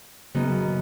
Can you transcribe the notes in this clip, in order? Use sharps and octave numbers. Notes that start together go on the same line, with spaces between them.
F#2 C#3 B3 D#4